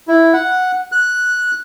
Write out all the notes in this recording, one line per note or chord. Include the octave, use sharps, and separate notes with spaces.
E4
F#5
F#6